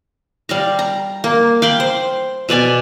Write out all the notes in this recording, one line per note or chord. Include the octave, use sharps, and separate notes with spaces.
G3 F5 A#5
A#5
A#3
F5 G5 B5 C6
C5
B2 B4 D5 G#5